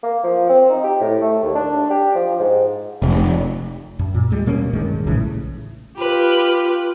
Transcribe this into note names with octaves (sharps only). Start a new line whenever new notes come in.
A#3
F3
C4
D#4
G4
A2
A3
D#2
D4
G4
F3
G#2
F1
F#2
A#2
D#2 G3 G#3
B2 G3 A#3 C#4
D1 G2 D#3 G#3
A#1 A2 C#3 E3
F4 G4 B4